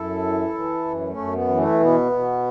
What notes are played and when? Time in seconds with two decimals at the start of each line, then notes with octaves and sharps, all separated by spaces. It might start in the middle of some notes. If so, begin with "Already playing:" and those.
Already playing: F#2 E4 A4
0.22 E3
0.54 E3
0.85 F#2
1.09 A3 C#4
1.17 F#2
1.33 B3
1.48 E3
1.57 A3
1.80 B2 B3
2.12 B2